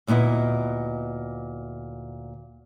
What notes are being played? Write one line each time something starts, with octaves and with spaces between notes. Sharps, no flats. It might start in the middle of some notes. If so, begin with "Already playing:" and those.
D2 A#2 B3 E4 D#5